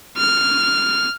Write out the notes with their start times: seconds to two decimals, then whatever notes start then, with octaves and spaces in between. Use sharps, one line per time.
0.18 F6